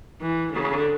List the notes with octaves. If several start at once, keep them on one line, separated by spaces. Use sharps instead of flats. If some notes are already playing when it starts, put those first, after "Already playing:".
E3
D3